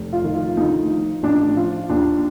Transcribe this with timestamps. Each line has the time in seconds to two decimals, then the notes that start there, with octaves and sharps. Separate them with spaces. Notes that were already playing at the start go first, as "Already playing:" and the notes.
Already playing: F1
0.13 F4
0.24 D#3
0.34 F4
0.57 D2 D#4
0.89 F3
1.23 A1 D4
1.57 F3 F4
1.90 D#2 D4